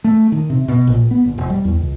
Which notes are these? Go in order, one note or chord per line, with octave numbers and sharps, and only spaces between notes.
A3
D#3
C3
B2
A#1
B3
G1
F1
G3
E2
C#2